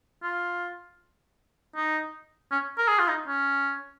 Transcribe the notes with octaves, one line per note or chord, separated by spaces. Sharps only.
F4
D#4
C#4
A#4
G#4
F4
D#4
C#4